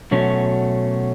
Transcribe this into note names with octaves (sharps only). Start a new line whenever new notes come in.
B2 F#3 A3 C#4